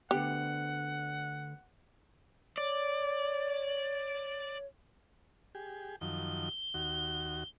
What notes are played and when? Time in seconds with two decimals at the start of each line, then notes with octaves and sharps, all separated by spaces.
0.11 D2 D3 B3 G4 F#5
2.58 C#5 D5
5.55 G4 G#4
6.01 F#2 D#3 F3 G7
6.74 D#2 F#4